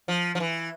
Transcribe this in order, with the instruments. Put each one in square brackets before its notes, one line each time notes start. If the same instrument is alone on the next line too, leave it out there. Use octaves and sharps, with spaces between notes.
[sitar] F3
F3
E3